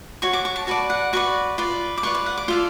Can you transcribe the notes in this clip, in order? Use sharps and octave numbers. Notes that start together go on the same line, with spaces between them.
F#4 C#5 C#6
D6
C#6
A5
F#4 B4 D5 A5
F#5
F#4 B4 D5 C#6
F4 B4 D5
D6
F4 B4 D5 C#6
F5
F#5
D6
F4 A4 D5 F5